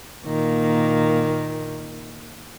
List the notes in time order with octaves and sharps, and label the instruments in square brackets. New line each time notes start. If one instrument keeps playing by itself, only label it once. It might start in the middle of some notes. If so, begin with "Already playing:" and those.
[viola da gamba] A#2 D#3 A#3